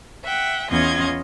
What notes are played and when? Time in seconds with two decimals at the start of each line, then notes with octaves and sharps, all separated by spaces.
0.24 E5 F#5 G5
0.70 E2 B3 C#4 F4 D#5 G#6